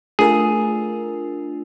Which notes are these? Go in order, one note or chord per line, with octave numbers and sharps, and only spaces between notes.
A3 D4 F4 G#4 A#4